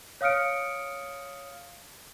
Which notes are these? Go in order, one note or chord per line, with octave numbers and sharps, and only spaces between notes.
C#5 F5 D#6 F6 C#7 D7